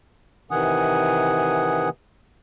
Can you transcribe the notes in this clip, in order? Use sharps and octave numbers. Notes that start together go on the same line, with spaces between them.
C3 D#3 E3 F#5 G#5 D#6